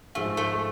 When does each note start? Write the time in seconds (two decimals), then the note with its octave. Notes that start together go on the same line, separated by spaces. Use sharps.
0.15 G#2 F3 G#3 A3
0.37 A3